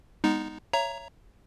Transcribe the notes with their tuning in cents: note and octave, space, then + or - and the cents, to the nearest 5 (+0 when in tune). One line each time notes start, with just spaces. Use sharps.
G#3 -25 B3 +5 D#4 +0
C#5 +0 E5 +30 A#5 +5